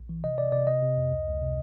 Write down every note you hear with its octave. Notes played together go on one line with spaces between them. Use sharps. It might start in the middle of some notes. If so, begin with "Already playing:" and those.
Already playing: A#1
E3
C3 D#5
C3 D5
C3 D5
C3 D#5
C3
F2
C#2
C#2
C3